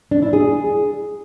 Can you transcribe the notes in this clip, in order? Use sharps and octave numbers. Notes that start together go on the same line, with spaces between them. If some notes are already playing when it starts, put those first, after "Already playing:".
D4
E4
G#4